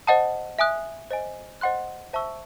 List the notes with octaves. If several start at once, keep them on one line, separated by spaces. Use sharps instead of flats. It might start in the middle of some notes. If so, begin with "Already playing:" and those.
C5 D#5 F#5 A5 D#6
E5 G#5 D#6 F#6
C5 D#5 G#5
C5 D#5 F#5 C6 F#6
C5 E5 A5 C#6 E6